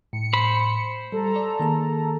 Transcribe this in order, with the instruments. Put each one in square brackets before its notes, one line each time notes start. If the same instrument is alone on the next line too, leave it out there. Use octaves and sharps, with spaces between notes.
[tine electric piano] A2 [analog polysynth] C#7
[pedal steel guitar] C5 B5
[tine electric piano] G3 [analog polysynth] A4 A#5
[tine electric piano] D5
D#3 A#3 G#4